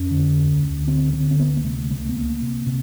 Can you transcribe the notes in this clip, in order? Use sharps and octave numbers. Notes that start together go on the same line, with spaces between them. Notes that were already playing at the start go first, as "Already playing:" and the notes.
Already playing: F2 C#4
D3
D2
D2
D3 C4
D3 C4
C4
D2 B3
A#3
C3 A3
C#2 A3
B3
C#2 A#3
C3
C3